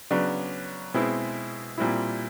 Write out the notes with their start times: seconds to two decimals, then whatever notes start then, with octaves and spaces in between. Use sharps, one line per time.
0.11 C#3 F#3 B3 D4
0.94 B2 G#3 C4 E4
1.78 A#2 G3 C4 E4